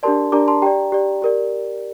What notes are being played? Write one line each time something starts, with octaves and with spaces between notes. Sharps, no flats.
D4 G4 A#4 D5 A5 C6
D4 G4 A#4 D5 A#5 D6
A5 C6
G4 D5 G5 A#5
G4 D5
G4 A#4 D5